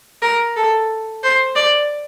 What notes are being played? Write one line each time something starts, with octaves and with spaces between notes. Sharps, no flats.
A#4
A4
C5
D5